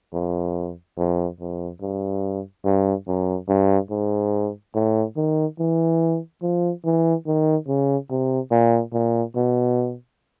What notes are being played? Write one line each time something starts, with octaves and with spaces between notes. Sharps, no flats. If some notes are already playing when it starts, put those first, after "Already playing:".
F2
F2
F2
G2
G2
F#2
G2
G#2
A2
D#3
E3
F3
E3
D#3
C#3
C3
A#2
A#2
B2